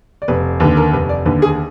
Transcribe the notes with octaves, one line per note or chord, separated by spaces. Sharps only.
D5
F1 B4
D#2 D3 B4
A#4
F1 B4
D5
D#2 D3 B4
G#4